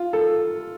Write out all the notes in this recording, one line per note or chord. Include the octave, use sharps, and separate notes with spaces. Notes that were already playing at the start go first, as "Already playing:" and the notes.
Already playing: F4
A4